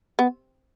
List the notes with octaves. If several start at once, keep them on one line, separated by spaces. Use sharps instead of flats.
B3